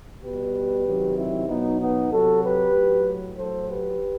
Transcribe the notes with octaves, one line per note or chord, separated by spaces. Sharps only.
B2 G3 G4 B4
C3 D#3 F#3
C4 E4
B2 F#3 B3 D#4
B3 D#4
C3 F#3 F#4 A4
G4 B4
A2 F#3
A2 F#3 A4 C5
G4 B4